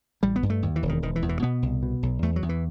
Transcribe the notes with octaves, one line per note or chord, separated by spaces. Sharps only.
A1 G3
B3
G2
A3
D#2
E3
E1
D#3
E1 D#3
E3
E2
E3
B2 B3
C2
B2
B1
E2 A3
F#3
E2
E3